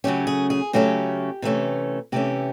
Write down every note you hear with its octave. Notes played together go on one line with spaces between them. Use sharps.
C#3 F#3 A3 C#4 G4
G#4
G#4
C#3 F#3 A3 C#4 G4
C3 E3 A3 C#4
C3 E3 A3 C#4 G4